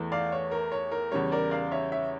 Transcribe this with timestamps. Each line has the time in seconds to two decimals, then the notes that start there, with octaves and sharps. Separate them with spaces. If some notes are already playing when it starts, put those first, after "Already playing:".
Already playing: E2 E3 A3
0.12 D5 F5
0.32 C#5
0.51 A#4
0.72 C#5
0.91 A#4
1.11 E2 C#3 G3 C#5
1.32 A#4 D5
1.51 D5 F5
1.72 C#5 E5
1.92 C#5 E5